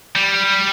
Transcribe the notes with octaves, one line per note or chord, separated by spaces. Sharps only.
G3